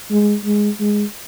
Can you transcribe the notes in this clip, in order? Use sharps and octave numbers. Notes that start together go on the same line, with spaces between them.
G#3
G#3
G#3